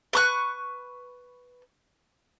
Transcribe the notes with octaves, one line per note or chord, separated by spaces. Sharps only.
B4 C#6 F#6